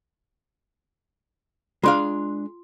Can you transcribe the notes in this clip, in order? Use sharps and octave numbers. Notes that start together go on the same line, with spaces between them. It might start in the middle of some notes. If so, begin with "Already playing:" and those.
G#3 D4 F4 F5 C6